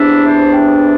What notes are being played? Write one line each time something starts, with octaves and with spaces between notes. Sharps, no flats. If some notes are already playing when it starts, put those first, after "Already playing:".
Already playing: E2 C3 E3 B3 D4 E5
C5
G4